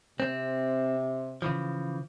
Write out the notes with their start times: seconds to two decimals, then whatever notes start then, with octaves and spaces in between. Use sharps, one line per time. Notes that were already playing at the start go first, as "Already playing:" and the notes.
0.20 C3 C4
1.42 C#3 E3 F3